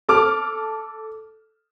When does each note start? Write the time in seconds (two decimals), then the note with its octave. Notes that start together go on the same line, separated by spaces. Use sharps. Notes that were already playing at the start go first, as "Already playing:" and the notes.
0.09 A4 D6 F6